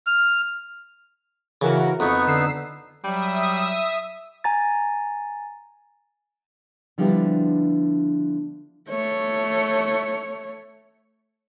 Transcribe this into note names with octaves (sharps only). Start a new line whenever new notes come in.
F6
C#3 E3 F#4 A#4
F2 B3 D#4 B4 C#6
D3 E6 C7
F#3 G3 E5 D#6
G#5 A#5 A6
D3 F3 G3 B3 D4 E4
A3 C#5